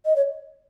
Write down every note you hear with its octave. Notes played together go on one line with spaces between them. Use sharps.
D#5
C#5